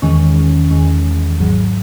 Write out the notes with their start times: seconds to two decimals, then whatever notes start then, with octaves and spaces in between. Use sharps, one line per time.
0.02 E2 D#3 G#3 C#4
0.71 E2 D#3 G#3 C#4
1.39 G#1 G#2 F#3